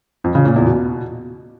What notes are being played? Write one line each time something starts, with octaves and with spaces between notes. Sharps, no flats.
F2
C#3
A#2
E2
B2